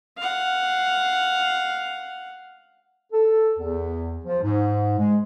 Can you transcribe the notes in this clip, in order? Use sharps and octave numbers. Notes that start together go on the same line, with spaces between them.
F5 F#5
A4
E2
F3
G#2
G#3